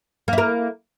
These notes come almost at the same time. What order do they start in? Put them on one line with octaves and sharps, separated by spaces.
A#3 E4 A#4